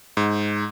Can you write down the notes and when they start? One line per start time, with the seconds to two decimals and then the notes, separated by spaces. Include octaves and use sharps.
0.17 G#2